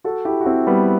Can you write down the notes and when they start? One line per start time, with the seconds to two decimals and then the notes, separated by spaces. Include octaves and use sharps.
0.04 F#4 A4
0.25 E4 G4
0.41 F#4
0.46 C4 E4
0.67 G3 B3